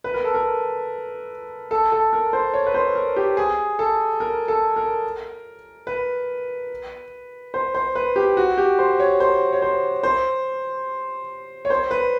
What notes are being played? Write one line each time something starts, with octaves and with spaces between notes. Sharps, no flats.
B4
A#4
A4
A#4
A4
A4
A#4
C5
C#5
B4
C5
A#4
G4
G#4
A4
A#4
A4
A#4
B4
C5
C5
B4
G4
F#4
G4
C5
C#5
C5
C#5
C5
C5
C#5
C5
B4